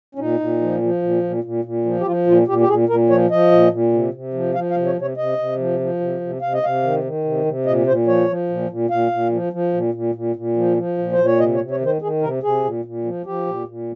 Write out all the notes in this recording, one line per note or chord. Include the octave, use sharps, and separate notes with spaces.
C#4
A#2 D#4
A#2
F3
F3
A#2
A#2
A#2
A#2
F3
G4
F3 F4
A#2 F4
A#2 G4
G4
A#2 G#4
A#2 A#4
F3 C#5
F3 D#5
A#2
A#2
C3
C3
F3
F3 F5
F5
C3
C#5
C3
C#5
C3 D#5
C3
F3
F3
C3
C3
C3 F5
D#5
C3 F5
D#3
D#3
C3
C3
A#2 D#5
A#2 C5
F3 C#5
F3
A#2
A#2
A#2 F5
A#2
F3
F3
A#2
A#2
A#2
A#2
F3
F3
A#2
C5
A#2
C#5
C3 D#5
C#5
C3
C#5
D#3
C5
D#3 G#4
C3 A#4
C3 G#4
A#2
A#2
F3
F3 G4
A#2
A#2